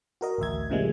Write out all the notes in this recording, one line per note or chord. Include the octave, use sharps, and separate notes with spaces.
F#4 A#4 D#5
A1 D2 E5 G#6
A2 C#3 F3 G3 G#3 A#3